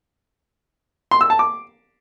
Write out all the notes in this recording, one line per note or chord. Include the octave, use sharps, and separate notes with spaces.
C6
E6
A5
D6